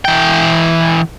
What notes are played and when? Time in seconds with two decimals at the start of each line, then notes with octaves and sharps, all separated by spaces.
0.05 E3 G5